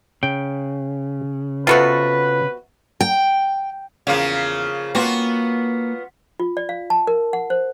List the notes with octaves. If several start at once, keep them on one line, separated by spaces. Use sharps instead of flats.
C#3 G5
C3 B3 F4 F#4 A4 B4
G5
E2 C#3 F3 A#3 F5
A#3 B3 F4 F#4
F4
D5
F5
A5
A#4
F#5
C5